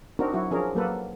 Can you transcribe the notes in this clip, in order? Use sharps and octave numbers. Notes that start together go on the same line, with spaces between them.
C4 D4 D#4 F#4 A#4
F#3 E4 F#4
F3 C#4 D4 G#4 A#4
F#3 A#3 A4 B4